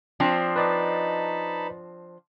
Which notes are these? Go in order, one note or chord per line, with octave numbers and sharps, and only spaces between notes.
F3 C4 D4
D#4 B4 D5 D#5 A5 B5